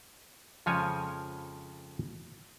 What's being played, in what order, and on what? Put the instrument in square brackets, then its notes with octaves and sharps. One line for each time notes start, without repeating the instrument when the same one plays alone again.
[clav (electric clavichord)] F2 C#3 F3 G#3 C#5 G#5